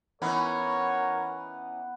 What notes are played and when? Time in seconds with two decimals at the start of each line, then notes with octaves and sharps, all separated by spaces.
0.22 E3 B3 C#4 D#4 A#4 C#5